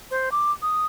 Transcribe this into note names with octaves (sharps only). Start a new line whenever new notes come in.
C5
D6
D#6